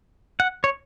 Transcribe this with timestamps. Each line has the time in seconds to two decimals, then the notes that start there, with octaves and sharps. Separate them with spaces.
0.40 F#5
0.64 C#5